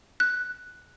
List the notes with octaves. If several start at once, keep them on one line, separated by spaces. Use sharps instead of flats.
F#6